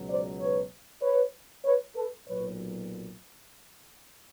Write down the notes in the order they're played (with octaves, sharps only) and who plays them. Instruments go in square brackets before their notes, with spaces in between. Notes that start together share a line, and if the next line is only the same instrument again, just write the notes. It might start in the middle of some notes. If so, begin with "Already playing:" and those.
Already playing: [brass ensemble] C#2 B2 F#3
C5 D5
B4 C#5
B4 C#5
B4 C#5
A4 B4
B1 A#2 F#3 B4 C#5